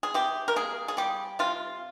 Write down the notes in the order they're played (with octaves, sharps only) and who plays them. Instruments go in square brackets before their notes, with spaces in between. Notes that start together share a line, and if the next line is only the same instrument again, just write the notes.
[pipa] G#4
C3 G4
A#4
A#3 G#4
G#4
G3 G4
C3 F4